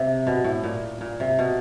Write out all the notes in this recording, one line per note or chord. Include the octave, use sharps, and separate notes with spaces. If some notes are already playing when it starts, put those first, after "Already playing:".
Already playing: C3
B2
A2
A#2
A#2
C3
B2